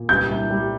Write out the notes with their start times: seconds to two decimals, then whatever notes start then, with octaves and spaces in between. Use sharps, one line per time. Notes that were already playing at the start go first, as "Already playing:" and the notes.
Already playing: A#2
0.09 G3 G6
0.29 C2
0.50 G3